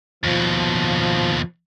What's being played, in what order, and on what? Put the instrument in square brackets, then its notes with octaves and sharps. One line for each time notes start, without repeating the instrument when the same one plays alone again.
[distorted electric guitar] D#2 B2 [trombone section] F3